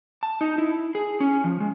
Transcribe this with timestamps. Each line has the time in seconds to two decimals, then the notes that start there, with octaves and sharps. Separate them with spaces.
0.23 A5
0.41 D#4
0.58 E4
0.95 G#4
1.20 C#4
1.44 F3
1.60 G#3